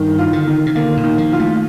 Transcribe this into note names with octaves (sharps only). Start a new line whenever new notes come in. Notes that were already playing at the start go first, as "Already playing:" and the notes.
Already playing: G2 D#3
F4
D3
D#3
C3
D3 A#3
A#2
D#3
F3
F4
A3